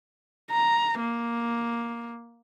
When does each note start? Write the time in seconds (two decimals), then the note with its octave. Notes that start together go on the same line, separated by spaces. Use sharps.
0.51 A#5
1.00 A#3